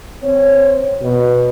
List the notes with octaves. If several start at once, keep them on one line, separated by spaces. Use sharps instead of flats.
C4 C#5
B2